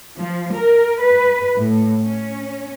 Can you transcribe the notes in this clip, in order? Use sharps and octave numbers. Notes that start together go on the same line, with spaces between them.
F3
A#4
B4
A2
C#4